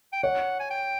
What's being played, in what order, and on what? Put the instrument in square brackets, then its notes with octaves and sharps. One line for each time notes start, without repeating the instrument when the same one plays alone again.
[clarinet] G5
[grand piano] C#5 [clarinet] F#5
[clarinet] G#5
G5